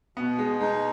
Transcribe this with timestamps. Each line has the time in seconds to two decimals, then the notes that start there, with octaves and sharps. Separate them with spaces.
0.17 B2 B3
0.39 G#3
0.60 G#3 D#4